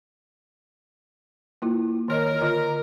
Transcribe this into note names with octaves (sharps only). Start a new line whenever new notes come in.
A#3 E4 F4
D#3 A#4 C#5 D#5
D3 F4 D#5